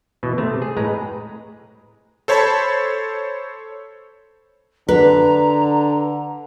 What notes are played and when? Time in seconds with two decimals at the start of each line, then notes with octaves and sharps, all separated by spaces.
0.23 B2 E3
0.38 C3 A3
0.62 G#4
0.77 A2 G#3 B4 A#5
2.28 A4 C5 C#5 A5 B5
4.89 D3 B4 A#5